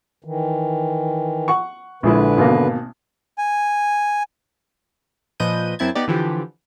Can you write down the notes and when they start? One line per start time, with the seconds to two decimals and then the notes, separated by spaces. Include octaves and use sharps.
0.24 D#3 E3
1.48 F#5 C#6
2.03 A#1 D3 G#3 E4 B4
2.37 G#1 B2 A#3
3.38 G#5
5.40 A#2 F3 B4 D#5 G6 D#7
5.79 F#2 C4 E4 A5 G#6
5.95 B3 D#4 G4 D5
6.08 D3 E3 F3 G4